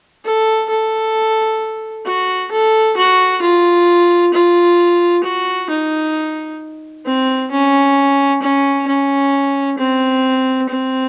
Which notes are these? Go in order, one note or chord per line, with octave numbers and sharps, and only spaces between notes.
A4
A4
F#4
A4
F#4
F4
F4
F#4
D#4
C4
C#4
C#4
C#4
C4
C4